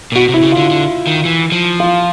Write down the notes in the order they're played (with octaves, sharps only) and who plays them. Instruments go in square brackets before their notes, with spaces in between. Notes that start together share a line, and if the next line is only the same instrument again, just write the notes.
[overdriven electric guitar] A#2
[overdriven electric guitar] B2 [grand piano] F#4
[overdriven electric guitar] C3
[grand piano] E4
[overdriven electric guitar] C#3
[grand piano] F4
[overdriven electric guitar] D3
D3
D#3
E3
F3
[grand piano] F4